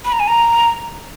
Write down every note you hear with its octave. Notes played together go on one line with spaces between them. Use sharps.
B5
A#5
G#5
A#5